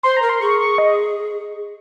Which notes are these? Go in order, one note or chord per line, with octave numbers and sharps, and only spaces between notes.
C5 C6
A#5
A#4
C6
G#4 C#6
C#6
D#5